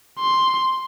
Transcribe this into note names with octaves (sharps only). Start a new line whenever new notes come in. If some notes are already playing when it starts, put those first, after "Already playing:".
C6